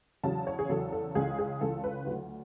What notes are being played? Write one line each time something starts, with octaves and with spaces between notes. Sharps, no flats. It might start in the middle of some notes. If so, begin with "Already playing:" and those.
E2 C#3 F#3 A5
C#5
G#4
E2 C#3 F#3 A4
A4
C#2 C#3 E3 G#4
G#4
C#2 C#3 E3 A4
B4
D2 D3 F#3